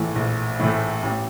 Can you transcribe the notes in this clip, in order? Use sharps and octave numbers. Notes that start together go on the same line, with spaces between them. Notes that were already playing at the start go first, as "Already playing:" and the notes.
Already playing: A#1 A2 E3 A3
A#1
A2 E3 A3
A1